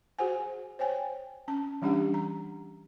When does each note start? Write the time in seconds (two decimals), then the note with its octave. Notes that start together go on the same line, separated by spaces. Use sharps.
0.19 F#4 G#4 C5 F#5 G#5
0.79 C5 C#5 G5 G#5
1.48 C#4 A5
1.82 E3 G3 C#4 D4 G4 F#5
2.14 A#5